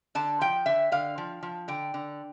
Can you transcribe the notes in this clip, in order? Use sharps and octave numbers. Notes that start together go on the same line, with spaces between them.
D3 A5
F3 G5
D3 E5
D3 F5
F3
F3
D3 G5
D3